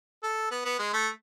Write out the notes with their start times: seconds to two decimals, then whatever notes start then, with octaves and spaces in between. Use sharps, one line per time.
0.23 A4
0.51 B3
0.65 B3
0.79 G#3
0.93 A3